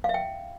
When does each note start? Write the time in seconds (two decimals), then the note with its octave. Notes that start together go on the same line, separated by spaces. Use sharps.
0.04 F5
0.09 E5
0.14 G5